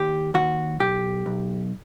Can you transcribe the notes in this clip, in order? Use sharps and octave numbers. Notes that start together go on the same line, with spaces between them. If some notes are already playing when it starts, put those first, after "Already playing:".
Already playing: D#2 G4
D#2 F#4
B1 G4
B1